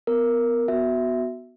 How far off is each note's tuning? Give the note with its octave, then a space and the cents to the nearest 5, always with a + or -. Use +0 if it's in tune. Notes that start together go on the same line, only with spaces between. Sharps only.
B3 +15 A#4 +0
B3 +0 F#4 +0 E5 +0